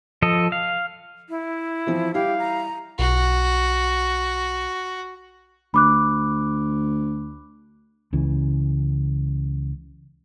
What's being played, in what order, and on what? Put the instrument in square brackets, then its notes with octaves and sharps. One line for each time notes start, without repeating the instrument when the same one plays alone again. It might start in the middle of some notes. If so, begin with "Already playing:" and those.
[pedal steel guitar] F3 A4 D#5
F5
[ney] E4
[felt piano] E3 F3 C4
[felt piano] G3 E4 [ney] G4 [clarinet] F5
[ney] A#5
[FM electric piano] B1 [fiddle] F#4
[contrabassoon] D2 [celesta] B5 D6 F#6
[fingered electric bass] C#2 C#3 E3